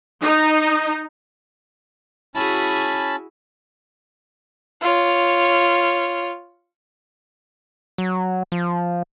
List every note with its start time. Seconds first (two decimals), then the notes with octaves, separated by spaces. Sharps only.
0.22 D#4
2.35 C#4 E4 F#4 G#4 A5 B5
4.82 F4 C#5
7.98 F#3
8.52 F3